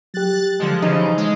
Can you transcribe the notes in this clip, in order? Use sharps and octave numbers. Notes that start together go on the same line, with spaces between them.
F#3 G4 F#6 A6
D3 F3 G#3
C#3 E3 F3 D#4
G#3